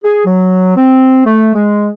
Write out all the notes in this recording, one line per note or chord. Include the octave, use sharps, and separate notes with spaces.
G#4
F#3
C4
A3
G#3